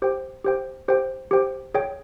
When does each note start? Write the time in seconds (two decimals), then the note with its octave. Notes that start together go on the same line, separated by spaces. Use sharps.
0.02 G4 C5 G5
0.44 G4 C5 G5
0.88 G4 C5 G5
1.31 G4 C5 G5
1.74 G#4 C#5 G5